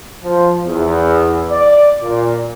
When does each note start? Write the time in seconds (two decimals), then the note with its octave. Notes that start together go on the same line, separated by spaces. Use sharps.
0.23 F3
0.65 E2
1.51 D5
2.02 A#2